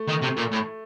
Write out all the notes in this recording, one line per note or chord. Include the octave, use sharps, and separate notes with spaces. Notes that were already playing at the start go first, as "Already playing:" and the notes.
Already playing: A3
D#3
C3
A#2
A2